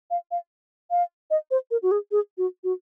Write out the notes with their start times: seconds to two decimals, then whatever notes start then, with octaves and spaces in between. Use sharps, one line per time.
0.11 F5
0.31 F5
0.91 F5
1.30 D#5
1.51 C5
1.71 A#4
1.83 F#4
1.91 G#4
2.12 G#4
2.38 F#4
2.64 F#4